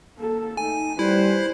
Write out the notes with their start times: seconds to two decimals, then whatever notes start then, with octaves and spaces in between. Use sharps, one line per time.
0.16 A#3 A4
0.57 A3 D#4 G#5
0.99 G3 E4 B4 C5